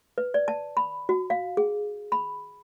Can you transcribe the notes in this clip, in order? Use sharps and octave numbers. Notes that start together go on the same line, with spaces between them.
B4
D5
A5
B5
F#4
F5
G#4
B5